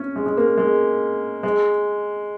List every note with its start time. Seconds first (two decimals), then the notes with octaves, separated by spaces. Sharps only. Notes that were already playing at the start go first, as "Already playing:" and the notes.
Already playing: C#4
0.16 G#3
0.26 G#3
0.37 A#3
0.58 G#3
1.43 G#3